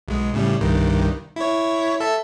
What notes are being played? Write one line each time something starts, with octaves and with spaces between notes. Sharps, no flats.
B1 G#3
A2 C#3 G3
C2 G2 D#3
E4 C#5
A4 E5 A5